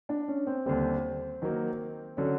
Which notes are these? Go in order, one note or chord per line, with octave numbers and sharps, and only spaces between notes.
D4
C#4
C4
D#2 D3 G3 C4
D#3 F#3 A#3
D3 F#3 C#4